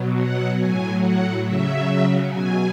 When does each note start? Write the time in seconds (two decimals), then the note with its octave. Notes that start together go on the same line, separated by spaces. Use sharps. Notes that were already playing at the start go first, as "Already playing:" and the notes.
Already playing: B2 F#3
0.16 F#5
0.59 A2 F#3 G#5
1.00 F#5
1.43 C#3 F#3 E5
2.28 B2 F#3 G#5